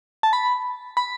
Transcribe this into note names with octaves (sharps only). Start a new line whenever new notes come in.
A5
B5
B5